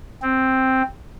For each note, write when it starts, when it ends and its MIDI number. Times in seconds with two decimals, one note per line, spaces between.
0.23 0.82 60